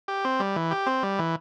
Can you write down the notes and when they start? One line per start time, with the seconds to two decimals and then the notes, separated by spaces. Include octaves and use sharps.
0.08 G4
0.25 C4
0.40 G3
0.56 E3
0.71 G4
0.86 C4
1.03 G3
1.19 E3